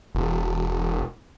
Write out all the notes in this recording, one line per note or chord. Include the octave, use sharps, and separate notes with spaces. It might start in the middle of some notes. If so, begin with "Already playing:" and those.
E1